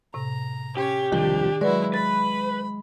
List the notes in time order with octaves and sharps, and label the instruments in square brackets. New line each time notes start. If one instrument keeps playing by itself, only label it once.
[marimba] A2 C3 [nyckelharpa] A#5
[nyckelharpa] C#4 C#5 [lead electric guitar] G4
[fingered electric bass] E1 C2 F3 [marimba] D#3 [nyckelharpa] D4
[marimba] F#3 B4 D5 [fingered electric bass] G#3 [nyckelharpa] E4 F#4
[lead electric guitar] B4 [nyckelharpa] B5 [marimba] A6